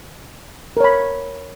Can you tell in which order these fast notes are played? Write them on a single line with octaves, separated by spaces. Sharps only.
A#4 C#5 B5